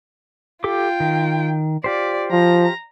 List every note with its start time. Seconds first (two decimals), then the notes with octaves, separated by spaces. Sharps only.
0.64 F4 G4 A4 G5 D6
1.00 D#3
1.84 F4 G4 C5 D5
2.32 F3 A#5